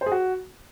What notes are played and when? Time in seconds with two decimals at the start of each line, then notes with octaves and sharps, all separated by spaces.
0.01 C5
0.06 G#4
0.12 F#4